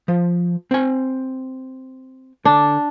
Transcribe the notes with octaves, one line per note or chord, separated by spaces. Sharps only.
F3
C4 G#5
D3 D4